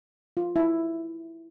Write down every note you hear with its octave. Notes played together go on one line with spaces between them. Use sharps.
F4
E4